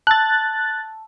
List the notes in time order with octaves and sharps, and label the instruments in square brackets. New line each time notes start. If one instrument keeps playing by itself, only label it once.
[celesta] A5 E6 [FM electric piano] F#6 A6